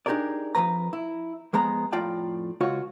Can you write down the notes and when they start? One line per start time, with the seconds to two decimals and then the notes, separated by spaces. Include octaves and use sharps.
0.06 D4 D#4 G4 G#4 A#4 D5
0.55 F2 C#3 F3 B4 A#5
0.93 E4
1.53 F2 G#3 B3 A#5
1.92 F2 A2 F4 D5 G5 A5
2.61 C#2 F4 F#4 C#5